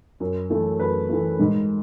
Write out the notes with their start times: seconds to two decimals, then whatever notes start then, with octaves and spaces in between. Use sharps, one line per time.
0.20 F#2
0.50 E3 A3
0.79 F#2 B4
1.09 E3 A3
1.39 G#2